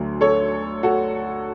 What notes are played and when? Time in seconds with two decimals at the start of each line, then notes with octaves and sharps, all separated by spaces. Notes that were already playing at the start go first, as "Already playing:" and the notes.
Already playing: D2 D3 F#3
0.21 A4 C#5
0.83 F#4 A4